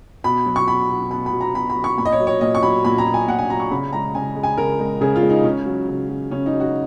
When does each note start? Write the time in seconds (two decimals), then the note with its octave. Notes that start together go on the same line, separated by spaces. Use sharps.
0.24 B2 B5
0.46 F#3
0.56 C#6
0.68 B2 B5
0.90 F#3
1.11 B2 B5
1.26 B5
1.33 F#3
1.41 A#5
1.54 B2 B5
1.70 B5
1.76 F#3
1.84 C#6
1.97 A#2 B5
2.05 D#5
2.12 C#5
2.20 F#3
2.27 C#5
2.41 A#2 D#5
2.55 C#6
2.63 F#3 B5
2.85 A#2 B5
2.98 A#5
3.06 F#3
3.14 G#5
3.28 A#2 F#5
3.39 G#5
3.49 F#3 A#5
3.60 C#6
3.71 C#3 B5
3.93 G#3 A#5
4.15 C#3 G#5
4.36 G#3
4.43 G#5
4.58 C#3 A#4
4.80 G#3
5.01 C#3 G#4
5.16 F4
5.22 G#3
5.30 D#4
5.44 C#3 C#4
5.66 F#3
5.88 C#3
6.09 F#3
6.31 C#3 C#4
6.46 D#4
6.53 F#3
6.60 F#4